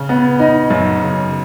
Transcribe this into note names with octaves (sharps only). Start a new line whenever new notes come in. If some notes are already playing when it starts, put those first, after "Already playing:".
Already playing: C#3
B3
D#4
F#2
C#3